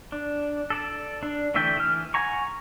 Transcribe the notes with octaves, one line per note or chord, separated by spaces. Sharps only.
D4
A4 D5 A5
D4
D3 E3 A3 E5 G5
E3 F6
F#5 G#5 A#5 C#6